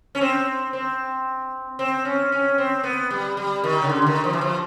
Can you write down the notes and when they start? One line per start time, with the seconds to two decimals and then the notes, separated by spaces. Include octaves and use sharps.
0.15 C#4
0.21 C4
0.73 C4
1.79 C4
2.05 C#4
2.32 C#4
2.58 C4
2.83 B3
3.10 G3
3.37 G3
3.64 D#3
3.82 C#3
3.89 D3
4.02 D3
4.06 D#3
4.24 F3
4.33 E3
4.41 F3